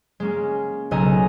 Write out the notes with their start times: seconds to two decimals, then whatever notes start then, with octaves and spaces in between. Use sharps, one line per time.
0.20 G#3 A#3 C#4
0.91 B1 C#3 A4 D#5 G#5 A#5